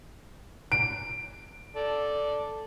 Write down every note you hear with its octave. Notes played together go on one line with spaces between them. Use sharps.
D7
A4 D5